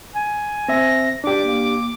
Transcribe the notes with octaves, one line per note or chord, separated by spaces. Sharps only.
G#5
C4 E5 A#6
D4 G4 D5 D6
A#3